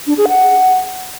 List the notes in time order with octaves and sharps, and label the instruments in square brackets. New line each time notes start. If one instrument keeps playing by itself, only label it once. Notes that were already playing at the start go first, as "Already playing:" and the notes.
[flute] D4
G#4
F#5